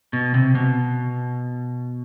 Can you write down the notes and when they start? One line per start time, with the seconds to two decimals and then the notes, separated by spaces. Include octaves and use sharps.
0.13 B2
0.34 C3
0.55 B2